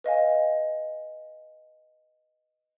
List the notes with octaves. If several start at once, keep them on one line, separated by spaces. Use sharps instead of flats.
B4 D#5 F5 G#5